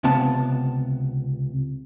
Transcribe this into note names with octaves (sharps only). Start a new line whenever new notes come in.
C#2 C3 B3 A5